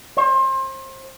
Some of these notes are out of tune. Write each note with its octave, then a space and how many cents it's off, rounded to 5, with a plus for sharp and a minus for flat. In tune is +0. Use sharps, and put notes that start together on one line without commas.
C5 +30